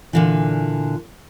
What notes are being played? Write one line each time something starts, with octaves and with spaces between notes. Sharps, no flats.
A#2 D3 E3